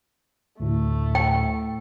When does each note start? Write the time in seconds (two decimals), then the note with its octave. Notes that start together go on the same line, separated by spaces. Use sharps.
0.60 D2 A2 A3
1.15 G5